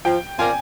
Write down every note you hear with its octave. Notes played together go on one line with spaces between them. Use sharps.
F3 G5
C4 F4 A#4 D5 G#5